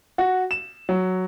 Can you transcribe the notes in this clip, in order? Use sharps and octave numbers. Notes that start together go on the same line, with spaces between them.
F#4
E7
F#3